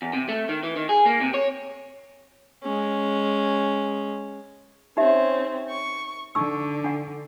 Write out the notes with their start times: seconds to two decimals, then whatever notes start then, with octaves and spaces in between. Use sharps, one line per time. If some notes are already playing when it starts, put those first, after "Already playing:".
0.02 E2
0.13 C3
0.29 A3
0.49 D#3
0.63 E3
0.76 D#3
0.89 G#4
1.06 A#3
1.21 C3
1.34 C#5
2.63 G#3 C#4
4.97 C4 C#4 D#4 G4 E5
5.70 C#6
6.35 D3 D#4 C#6 E6
6.84 D4 F#5